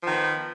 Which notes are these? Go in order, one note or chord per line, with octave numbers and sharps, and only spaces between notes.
D#3 F3 B3